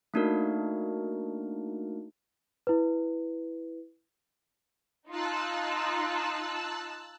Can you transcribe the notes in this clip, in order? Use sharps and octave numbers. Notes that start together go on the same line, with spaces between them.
A3 A#3 D4 D#4 F#4 A#4
E4 B4
D#4 F4 A5 E6 F#6